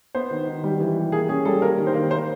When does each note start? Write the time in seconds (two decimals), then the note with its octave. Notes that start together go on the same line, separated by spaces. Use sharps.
0.15 B3 C5
0.31 D#3
0.47 D#3
0.64 G3
0.80 E3
0.97 G3
1.12 A#3 G#4
1.28 C#4 G#4
1.45 G3 A4
1.62 A#3 A#4
1.78 D#3
1.87 C5
1.94 A#3
2.11 A#3 C5